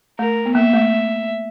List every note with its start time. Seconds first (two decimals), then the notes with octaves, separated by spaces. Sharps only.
0.19 A3 A#4
0.46 B3
0.55 A#3 E5
0.74 A3